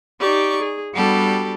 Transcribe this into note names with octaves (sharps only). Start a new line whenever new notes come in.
D#4 G4 D5 C#6
G#4
G3 B3 D4 F#4 G4 A4